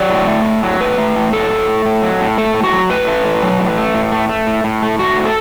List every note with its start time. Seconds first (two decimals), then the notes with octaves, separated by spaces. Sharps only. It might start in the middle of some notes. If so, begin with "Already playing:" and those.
Already playing: F#3 D5
0.11 A2
0.27 A3
0.45 A2
0.63 F#3
0.81 A2 B4
0.98 A3
1.16 A2
1.33 F#3 A4
1.50 A2
1.68 A3
1.86 A2
2.02 F#3
2.20 A2
2.38 A3 A4
2.54 A2
2.64 F#4
2.72 F#3
2.90 A2 B4
3.08 A3
3.24 A2
3.42 F#3
3.59 A2
3.78 A3
3.95 A2
4.12 A3
4.29 A3
4.47 A2
4.64 A2
4.82 A3
4.99 A3 F#4
5.17 A2
5.25 A4